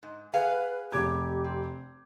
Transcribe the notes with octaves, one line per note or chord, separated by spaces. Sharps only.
G#2
G#4 B4 F5 F#5
F1 G4 D6 G#6
C4